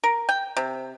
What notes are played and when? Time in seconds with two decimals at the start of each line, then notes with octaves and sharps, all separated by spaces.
0.04 A#4
0.29 G5
0.57 C3